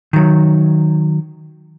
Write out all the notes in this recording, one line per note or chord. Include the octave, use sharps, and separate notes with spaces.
D#3 F#3